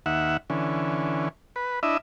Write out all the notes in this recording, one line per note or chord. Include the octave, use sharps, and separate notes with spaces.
D#2 E5 F#5
D3 E3 C#4
B4
D4 E4 D#5 E5